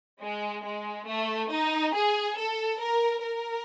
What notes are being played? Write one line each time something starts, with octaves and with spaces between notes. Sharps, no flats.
G#3
G#3
A3
D#4
G#4
A4
A#4
A#4